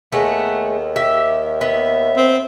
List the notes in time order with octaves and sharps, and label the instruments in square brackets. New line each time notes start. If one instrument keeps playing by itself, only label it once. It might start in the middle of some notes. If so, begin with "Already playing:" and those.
[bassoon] D#2 [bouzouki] G#3 A3 [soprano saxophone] B3
[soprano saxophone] G4 [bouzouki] E5
[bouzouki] B3 [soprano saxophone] E5
[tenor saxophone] C4